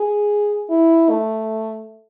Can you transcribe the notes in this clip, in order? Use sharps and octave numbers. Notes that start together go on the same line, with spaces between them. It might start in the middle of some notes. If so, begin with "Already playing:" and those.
Already playing: G#4
E4
A3